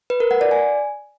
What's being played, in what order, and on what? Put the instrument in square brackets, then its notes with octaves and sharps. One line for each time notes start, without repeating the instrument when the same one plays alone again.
[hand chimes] B4
A#4
F#5
D5
G#5